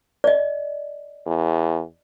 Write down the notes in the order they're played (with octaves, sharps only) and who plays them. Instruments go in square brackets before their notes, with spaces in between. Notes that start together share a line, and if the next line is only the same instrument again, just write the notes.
[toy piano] D5 D#5
[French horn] E2